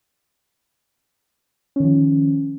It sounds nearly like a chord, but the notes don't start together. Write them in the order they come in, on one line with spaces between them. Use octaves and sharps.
C#4 D#3 F3